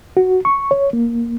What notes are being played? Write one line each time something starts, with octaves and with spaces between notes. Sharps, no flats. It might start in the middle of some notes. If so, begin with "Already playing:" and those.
F#4
C#6
C#5
A#3